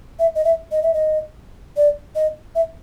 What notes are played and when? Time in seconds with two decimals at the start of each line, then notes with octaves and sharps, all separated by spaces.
0.19 E5
0.36 D#5
0.45 E5
0.72 D#5
0.83 E5
0.94 D#5
1.77 D5
2.15 D#5
2.55 E5